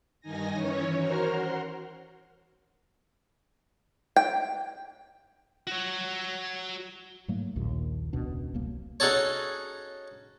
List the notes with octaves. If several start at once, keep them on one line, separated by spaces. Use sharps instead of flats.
G2 D#3 D#4 G#5 A#6
E3 C#4 C#5
F#4 A#4 C5 A#5 F6
F#5 C6
G5
F#4 C#5
G#2 F#3 A3 A#3
A#1 D#2 A#2
E1 C#2 B2 D4
E1 C2 F#3 A#3
C#4 D#4 F#4 G#4 A4 C#5